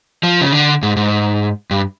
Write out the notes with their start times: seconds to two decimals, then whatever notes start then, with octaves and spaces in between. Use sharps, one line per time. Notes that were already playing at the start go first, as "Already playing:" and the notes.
0.23 F3
0.41 C#3
0.52 D3
0.83 G#2
0.97 G#2
1.71 G2